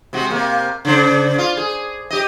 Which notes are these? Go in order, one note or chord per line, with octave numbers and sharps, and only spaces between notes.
C3 G#3 F#4
C3 A#3
C#3 D4 C5
F4
G#4
G4 D#5